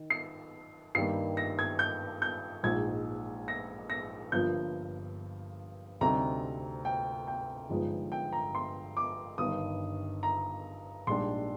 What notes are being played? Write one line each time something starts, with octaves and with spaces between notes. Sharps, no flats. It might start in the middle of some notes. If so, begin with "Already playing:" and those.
Already playing: D#3
C7
G2 D#3 G3 A#3 C7
A#6
G#6
G6
G6
A#1 G#2 F3 G#3 G#6
A#6
A#6
G1 G2 F3 A#3 G6
D2 C3 G3 C4 D#4 A#5
G5
G5
G1 G2 F3 G#3 D#4
G5
A#5
C6
D6
G1 G2 D#3 D#6
A#5
A#1 G#2 G3 D4 C6